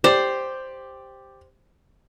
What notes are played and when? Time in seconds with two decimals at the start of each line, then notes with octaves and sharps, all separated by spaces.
0.04 G4 C5 D5